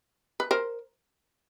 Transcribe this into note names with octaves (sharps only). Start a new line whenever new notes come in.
B4
A#4 C5